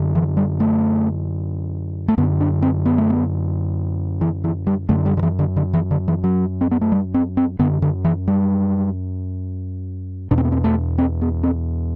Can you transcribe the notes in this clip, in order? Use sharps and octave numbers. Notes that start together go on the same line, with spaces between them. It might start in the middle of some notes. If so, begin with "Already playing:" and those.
Already playing: F#2 D3
E3
G3
A3
A3
F#2 D3 B3
D4
C4
B3
A3
B3
E3
E3
G3
F#2 D3 A3
G3
D3
E3
D3
D3
E3
D3
E3
F#3
C4
B3
A3
G3
C4
C4
F#2 D3 B3
D3
E3
G3
E2 B2 D4
C4
B3
C4
A3
C4
B3
C4